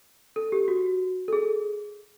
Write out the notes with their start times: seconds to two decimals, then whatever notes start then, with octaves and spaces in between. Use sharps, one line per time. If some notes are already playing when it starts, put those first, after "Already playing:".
0.36 A4
0.52 G4
0.68 F#4
1.28 A4
1.33 G#4